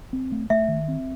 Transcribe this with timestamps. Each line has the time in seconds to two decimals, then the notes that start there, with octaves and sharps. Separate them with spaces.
0.13 C4
0.32 A3
0.50 A3 E5
0.68 D#3
0.88 C4